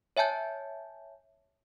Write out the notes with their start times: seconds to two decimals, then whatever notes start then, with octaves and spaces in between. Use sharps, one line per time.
0.17 C#5 E5 G#5 A5 G6